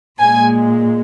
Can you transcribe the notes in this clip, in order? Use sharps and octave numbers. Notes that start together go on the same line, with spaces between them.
A#2 G#3 G#5